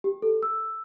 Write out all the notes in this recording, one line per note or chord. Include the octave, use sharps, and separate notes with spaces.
G4
A4
E6